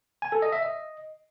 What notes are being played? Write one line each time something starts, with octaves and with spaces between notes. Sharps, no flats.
G#5
A4
D#5
E5
D#5